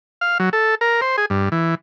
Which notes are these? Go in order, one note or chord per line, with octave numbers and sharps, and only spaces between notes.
F5
F#3
A4
A#4
C5
G#4
G2
E3